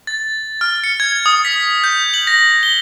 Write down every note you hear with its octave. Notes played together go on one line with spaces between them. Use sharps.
A6
F6
C#7
G#6
D#6
B6
G6
F#7
A#6
G7